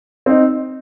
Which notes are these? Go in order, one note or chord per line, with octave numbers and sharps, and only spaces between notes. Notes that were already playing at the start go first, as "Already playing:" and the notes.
C4 D#4